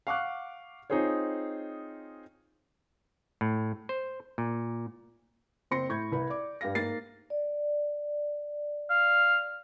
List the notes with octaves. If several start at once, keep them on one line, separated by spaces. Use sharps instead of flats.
F5 F#5 C#6 D6 F6 F#6
C4 D#4 F4 G#4 C5 C#5
A2
C5
A#2
F#1 C4 C5 C6 A#6 C#7
A2 B5 C#6 G6 G#6
C2 B4 B5
D5 D6
G2 G4 F5 A#6
G#2 A#3 A6 C7
D5
F5